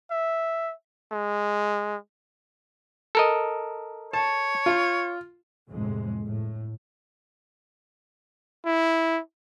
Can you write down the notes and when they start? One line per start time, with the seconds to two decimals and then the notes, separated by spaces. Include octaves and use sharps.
0.11 E5
1.12 G#3
3.15 A4 A#4 D#5
4.13 C#5 A5
4.66 F4
5.69 G1 F2 A2 C3 G#3
6.28 A2
8.66 E4